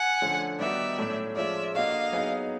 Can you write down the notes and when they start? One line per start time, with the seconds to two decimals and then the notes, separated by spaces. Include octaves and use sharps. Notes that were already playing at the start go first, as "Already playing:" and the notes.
Already playing: F#5 G#5
0.21 D3 F3 A3 C#4
0.59 D#3 G3 B3 D#4 F#4 D5 E5
0.98 A2 F#3 A3 C#4
1.36 F3 G#3 C#4 F4 D5 E5
1.74 A#3 D4 F#4 A4 D#5 F5
2.12 F#3 B3 D#4 G#4